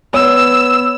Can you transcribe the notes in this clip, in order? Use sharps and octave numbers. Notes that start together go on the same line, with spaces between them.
B3 C#5 E6